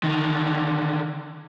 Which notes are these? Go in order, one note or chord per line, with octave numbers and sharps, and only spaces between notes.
D3 D#3